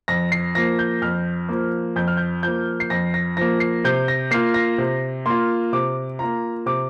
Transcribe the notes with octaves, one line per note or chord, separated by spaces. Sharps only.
F2 A#6
C7
F3 A#3 A#6
G6
F2 F6
F3 A#3
F2 G6
F6
G6
F3 A#3 G6
C7
F2 A#6
A#6
F3 A#3 A#6
C7
C3 G6
A#6
A#3 F4 C7
A#6
C3
A#3 F4 C6
C3 D6
A#3 F4 A#5
C3 D6